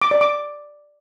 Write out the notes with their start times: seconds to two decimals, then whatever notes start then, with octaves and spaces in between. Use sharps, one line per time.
0.02 D6
0.11 D5
0.21 D6